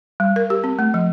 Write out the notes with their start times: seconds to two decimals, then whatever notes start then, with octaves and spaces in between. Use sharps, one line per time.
0.20 G3
0.36 A#4
0.50 G4
0.64 C4
0.79 A3
0.94 F3